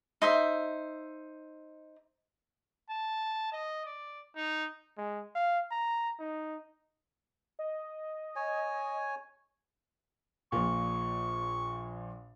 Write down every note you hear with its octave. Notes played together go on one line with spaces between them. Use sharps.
D#4 C5 E5
A5
D#5
D5
D#4
G#3
F5
A#5
D#4
D#5
C#5 G#5
A#1 A#2 C#6